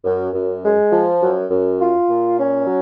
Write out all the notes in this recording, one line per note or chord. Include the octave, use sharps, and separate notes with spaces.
F#2
F#2
G#3
F3
F#2
F#2
F4
A#2
C#4
F#3